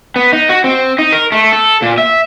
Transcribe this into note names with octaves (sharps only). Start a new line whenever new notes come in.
B3
D#4
F#4
C4
D#4
A#4
A3
A4
A#2
E5